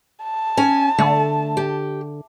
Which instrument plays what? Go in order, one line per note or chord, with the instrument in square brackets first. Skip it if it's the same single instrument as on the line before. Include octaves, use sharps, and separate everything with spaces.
[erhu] A5
[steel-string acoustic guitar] C#4 G#5
[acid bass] D3 [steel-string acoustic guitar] A3
[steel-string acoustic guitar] G4